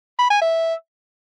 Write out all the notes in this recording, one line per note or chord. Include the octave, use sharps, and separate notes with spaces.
B5
G#5
E5